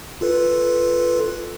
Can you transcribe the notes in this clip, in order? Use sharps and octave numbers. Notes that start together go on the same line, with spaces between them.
F4 A4 B4